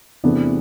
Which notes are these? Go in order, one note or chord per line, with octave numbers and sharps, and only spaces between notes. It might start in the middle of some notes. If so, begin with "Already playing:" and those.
E2 C3 E3 A3 B3 D4